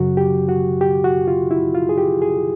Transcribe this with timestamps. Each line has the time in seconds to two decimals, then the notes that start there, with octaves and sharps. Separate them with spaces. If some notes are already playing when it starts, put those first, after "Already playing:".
Already playing: F#2 C#3 F#3 F#4
0.17 G4
0.49 F#4
0.81 G4
1.04 F#4
1.28 F4
1.51 E4
1.75 F4
1.89 G#4
1.98 G4
2.22 G#4